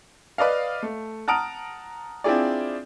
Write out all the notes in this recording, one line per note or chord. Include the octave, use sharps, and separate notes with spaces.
B4 D5 D#5 F5
A3
F#5 A5 A#5 D#6 F6 D7
C4 D4 E4 F4 G#4 D5